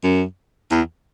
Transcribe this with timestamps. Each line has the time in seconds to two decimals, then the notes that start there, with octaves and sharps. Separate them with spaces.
0.04 F#2
0.71 E2